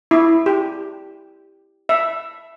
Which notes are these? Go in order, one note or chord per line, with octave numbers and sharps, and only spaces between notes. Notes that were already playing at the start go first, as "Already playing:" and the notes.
E4
G4
E5